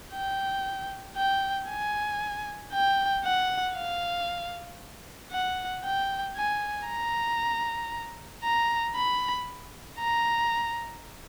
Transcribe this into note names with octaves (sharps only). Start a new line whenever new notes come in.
G5
G5
G#5
G5
F#5
F5
F#5
G5
G#5
A#5
A#5
B5
A#5